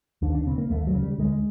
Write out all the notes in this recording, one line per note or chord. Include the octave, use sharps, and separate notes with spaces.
D#2 D4
D4
C#3 C4
A#3
D#2 A3
F#3
C#3
G3
D2 G#3